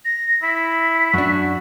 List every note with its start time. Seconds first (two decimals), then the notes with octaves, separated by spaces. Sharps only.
0.05 A#6
0.43 E4 B6
1.14 F#2 D4 F#4